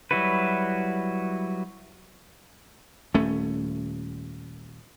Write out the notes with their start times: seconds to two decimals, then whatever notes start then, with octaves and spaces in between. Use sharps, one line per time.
0.11 F#3 G3 E4 F#4 B4
3.15 D#1 A3 C#4